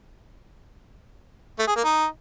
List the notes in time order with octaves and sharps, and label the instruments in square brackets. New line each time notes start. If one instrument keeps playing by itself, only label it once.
[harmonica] A3
G#4
A#3
D#4